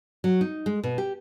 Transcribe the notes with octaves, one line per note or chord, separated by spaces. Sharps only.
F#3
D#4
G#3
B2
G4